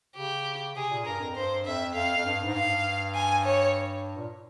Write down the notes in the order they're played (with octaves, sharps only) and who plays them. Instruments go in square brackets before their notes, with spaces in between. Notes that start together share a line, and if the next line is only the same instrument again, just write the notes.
[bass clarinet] C#3 [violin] G4
[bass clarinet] C3 [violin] G#4
[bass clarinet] A#2
[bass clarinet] G2 [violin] A#4
[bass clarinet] F2
[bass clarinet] G2 [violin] C5
[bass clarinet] F2 [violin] E5
[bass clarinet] F2 [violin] F5
[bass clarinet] F2
G2
G#2
[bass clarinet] G2 [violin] F5
[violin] G#5
C#5
[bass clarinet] A#2